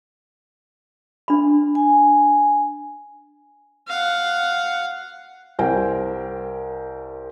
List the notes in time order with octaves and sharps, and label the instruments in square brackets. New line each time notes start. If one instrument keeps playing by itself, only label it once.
[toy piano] D4 B5
[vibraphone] G#5
[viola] F5 F#5
[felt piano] C2 A#4 C5 G5 G#5